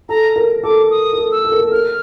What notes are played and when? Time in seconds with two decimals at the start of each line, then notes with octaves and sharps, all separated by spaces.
0.09 A4 A#5
0.36 A#4
0.63 A4 D6
0.91 D#6
1.13 A#4
1.18 A4
1.32 E6
1.45 A4
1.52 A#4
1.59 A4
1.72 A#4 F6